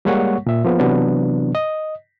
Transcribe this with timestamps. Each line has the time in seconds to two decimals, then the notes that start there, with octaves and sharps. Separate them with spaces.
0.05 G3 G#3 A#3 C#5 F#5 C#6
0.46 A#2 E5
0.65 F3 A#3 B3
0.80 C3 E3 F#3 B3 D4
1.55 D#5